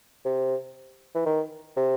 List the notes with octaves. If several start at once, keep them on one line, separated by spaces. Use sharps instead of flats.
C3
E3
D#3
C3